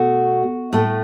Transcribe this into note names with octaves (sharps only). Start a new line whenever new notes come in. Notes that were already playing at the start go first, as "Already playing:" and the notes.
Already playing: B2 A3 F#4
A2 A3